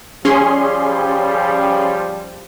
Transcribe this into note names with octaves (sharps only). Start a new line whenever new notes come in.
F3 G3 C#4 G#4 C6